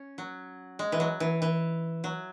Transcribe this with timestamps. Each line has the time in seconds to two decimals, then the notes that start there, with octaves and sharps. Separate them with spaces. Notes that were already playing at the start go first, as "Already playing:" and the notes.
Already playing: C#4
0.18 F#3
0.79 G#3
0.92 E3
1.00 F#3
1.20 E3
1.42 E3
2.04 F#3